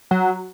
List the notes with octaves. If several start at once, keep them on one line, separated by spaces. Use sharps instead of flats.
F#3